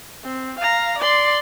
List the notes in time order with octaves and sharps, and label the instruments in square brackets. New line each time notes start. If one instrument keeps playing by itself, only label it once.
[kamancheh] C4
F5 A#5
D5 C6